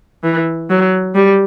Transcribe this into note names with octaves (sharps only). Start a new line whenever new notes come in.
E3
F#3
G3